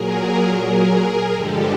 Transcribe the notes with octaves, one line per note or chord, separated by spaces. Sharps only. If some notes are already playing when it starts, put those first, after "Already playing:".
Already playing: A#2 F#3 G#4 A#4
G#4 A#4
G2 D3 F3 G#3 G4 A4